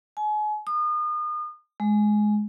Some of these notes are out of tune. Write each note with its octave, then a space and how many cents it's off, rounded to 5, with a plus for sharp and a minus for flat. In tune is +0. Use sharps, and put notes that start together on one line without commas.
G#5 +35
D#6 -35
G#3 +15